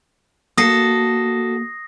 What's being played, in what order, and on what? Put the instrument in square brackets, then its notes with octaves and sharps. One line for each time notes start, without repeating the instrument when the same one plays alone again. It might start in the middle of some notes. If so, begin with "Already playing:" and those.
[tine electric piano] A#3 [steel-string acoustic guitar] F#4 A4 [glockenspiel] D#6 A#6 C7